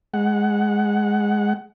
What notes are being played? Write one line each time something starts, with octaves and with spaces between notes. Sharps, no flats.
G#3 F#5